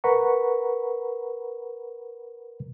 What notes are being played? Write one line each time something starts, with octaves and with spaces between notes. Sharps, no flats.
A#4 B4 F#5 A#5 B5 C#6